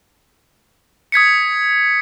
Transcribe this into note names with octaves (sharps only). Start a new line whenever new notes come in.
D#6 G#6 B6 C#7